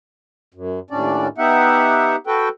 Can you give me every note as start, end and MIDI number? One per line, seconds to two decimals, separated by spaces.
0.54 0.79 42
0.90 1.27 39
0.90 1.27 45
0.90 1.27 61
0.90 1.27 62
0.90 1.27 74
1.38 2.16 59
1.38 2.16 63
1.38 2.16 67
1.38 2.16 76
1.38 2.16 78
2.27 2.49 66
2.27 2.49 69
2.27 2.49 71
2.27 2.49 79